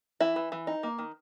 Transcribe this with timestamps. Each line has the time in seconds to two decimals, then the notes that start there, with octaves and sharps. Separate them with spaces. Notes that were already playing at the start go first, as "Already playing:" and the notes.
0.20 E3 E4
0.36 E3
0.52 E3
0.67 D#4
0.83 A#3
0.98 D#3